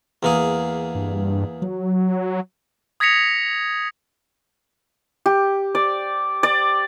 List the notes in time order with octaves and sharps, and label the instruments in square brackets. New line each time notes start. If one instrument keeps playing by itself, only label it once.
[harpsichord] E2 A#3 G#4
[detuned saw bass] G2
F#3
[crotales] D#6 G#6 A#6 B6 C#7 F7
[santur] G4
D5
D5